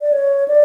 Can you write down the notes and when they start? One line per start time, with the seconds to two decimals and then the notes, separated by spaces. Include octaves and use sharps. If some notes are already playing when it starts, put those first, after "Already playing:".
0.01 D5
0.12 C#5
0.48 D5